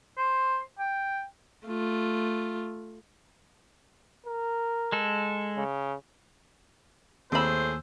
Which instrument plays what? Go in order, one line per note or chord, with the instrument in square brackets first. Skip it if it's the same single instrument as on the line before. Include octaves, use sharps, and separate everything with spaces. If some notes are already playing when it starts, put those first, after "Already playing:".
[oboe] C5
G5
[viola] A3 F4
[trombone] A#4
[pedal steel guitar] G#3 A4
[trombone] C#3
[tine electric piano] D#2 E6 [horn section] A2 G#4 [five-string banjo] C4 B5 [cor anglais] C5